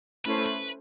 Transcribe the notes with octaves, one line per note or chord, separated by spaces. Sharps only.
A3 C#4 E4 A4 B4 C5
B4